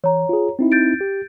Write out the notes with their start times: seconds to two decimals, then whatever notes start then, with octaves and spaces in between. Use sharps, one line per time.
0.04 E3 C#5 A#5
0.29 F4 G#4
0.59 C4 D#4 E4
0.72 G6 A6 D7
1.01 G4